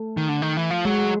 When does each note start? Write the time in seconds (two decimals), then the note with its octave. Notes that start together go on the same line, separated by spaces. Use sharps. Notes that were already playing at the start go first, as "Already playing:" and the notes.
Already playing: A3
0.17 D#3
0.29 D3
0.42 D#3
0.57 E3
0.71 F3
0.85 F#3 G#3